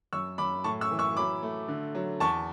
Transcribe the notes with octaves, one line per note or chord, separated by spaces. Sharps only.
F#2 C#6 E6
F#2 B5 D6
A2 A5 C#6
C#6 E6
E3
C#6 E6
F#3 B5 D6
A3
D3
F#3
E2 A5 C#6